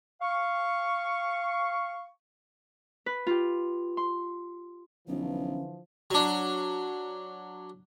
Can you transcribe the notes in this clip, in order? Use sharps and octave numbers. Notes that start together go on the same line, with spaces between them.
F5 C#6
B4
F4 G4
C6
B1 D3 E3 F3 C#4
F#3 D4